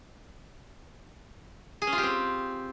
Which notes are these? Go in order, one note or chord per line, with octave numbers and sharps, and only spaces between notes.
G#4
C#4
F4
G4
C4